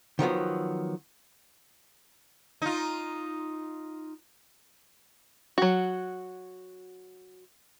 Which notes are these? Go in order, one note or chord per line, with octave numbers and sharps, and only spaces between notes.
D#3 F3 F#3 B3
D#4 F4
F#3 F#4